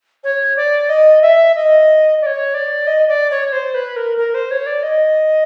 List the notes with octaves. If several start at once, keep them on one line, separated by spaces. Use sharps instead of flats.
C#5
D5
D#5
E5
D#5
D5
C#5
D5
D#5
D5
C#5
C5
B4
A#4
A#4
C5
C#5
D5
D#5